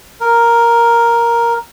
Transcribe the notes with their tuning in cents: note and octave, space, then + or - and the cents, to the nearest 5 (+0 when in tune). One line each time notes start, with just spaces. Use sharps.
A#4 +5